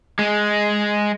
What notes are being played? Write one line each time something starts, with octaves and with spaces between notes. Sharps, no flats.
G#3